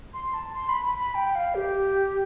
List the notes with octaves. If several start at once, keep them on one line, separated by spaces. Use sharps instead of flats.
C6
A5
C6
B5
B5
B5
G5
F5
G4